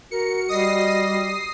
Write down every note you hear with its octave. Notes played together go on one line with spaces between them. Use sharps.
F#4 A#4 C#7
G3 D#5 D#6 A#6 C7